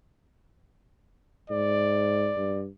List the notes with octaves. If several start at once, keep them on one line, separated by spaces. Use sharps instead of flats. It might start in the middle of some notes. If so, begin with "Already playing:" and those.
G#2 D5
G2